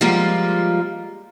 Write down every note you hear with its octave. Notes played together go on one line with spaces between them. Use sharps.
F3 G3 G#3 A#3 F4